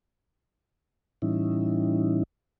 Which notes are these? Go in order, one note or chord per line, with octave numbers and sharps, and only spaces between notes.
A2 E3 G3 C#4 D#4 E4